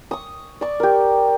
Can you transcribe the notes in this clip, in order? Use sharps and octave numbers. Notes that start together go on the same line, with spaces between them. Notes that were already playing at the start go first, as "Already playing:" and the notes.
C#6 D#6
D5 C#6
G4 A#4